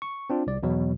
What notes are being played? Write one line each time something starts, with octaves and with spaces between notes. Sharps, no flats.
C#6
C4 D4 F4
C2 D5
E2 B2 F#3